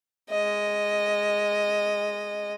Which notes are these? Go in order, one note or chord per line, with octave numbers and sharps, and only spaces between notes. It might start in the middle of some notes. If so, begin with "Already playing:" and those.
G#3 D#5